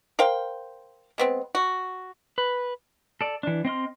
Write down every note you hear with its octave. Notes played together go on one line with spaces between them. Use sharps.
A#4 C5 F5 G5
G#3 B3 C4
F#4
B4
A4 D5
E3 D4
C4 D#5 C6 F6